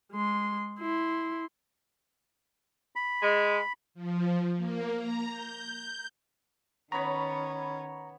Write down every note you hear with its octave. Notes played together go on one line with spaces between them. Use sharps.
G#3 C6
E4 C6
B5
G#3
F3
A#3
A#5
G6
D#3 B3 C#4 C#5 A#5 B5 C#6